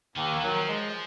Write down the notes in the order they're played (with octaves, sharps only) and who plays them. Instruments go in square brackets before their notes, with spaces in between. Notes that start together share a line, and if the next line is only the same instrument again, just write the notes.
[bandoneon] D#2 [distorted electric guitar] D#3
[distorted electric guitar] E3
[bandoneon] D#3 F#3
[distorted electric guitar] F3
[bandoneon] G#3